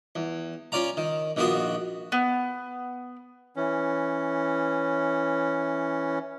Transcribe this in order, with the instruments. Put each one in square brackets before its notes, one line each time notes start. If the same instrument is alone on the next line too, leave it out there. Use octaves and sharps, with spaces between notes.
[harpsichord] E2
C#4 F4 D5 F5 A#5
D#3
A#1 D#3 B3 F4 F#4 D#6
[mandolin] B3
[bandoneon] E3 C#4